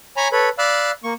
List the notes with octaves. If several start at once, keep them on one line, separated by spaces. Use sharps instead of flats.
C#5 G#5 A#5 B5
A4 B4 C#5 B5
D5 F5 B5 E6 F#6
A#3 C#6